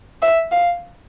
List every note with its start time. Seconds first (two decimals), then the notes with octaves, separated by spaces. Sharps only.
0.22 E5
0.52 F5